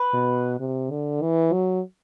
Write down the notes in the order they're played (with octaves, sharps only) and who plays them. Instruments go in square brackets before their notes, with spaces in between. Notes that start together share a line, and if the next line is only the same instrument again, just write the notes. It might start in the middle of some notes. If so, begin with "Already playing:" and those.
Already playing: [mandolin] B4
[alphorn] B2
C3
D3
E3
F#3